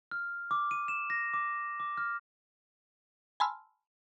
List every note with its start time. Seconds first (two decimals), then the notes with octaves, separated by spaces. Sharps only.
0.11 F6
0.51 D6
0.71 D#7
0.88 E7
1.10 A#6
1.34 D6
1.80 D6
1.98 F6
3.40 G#5 A5 B5 C6 E6 F6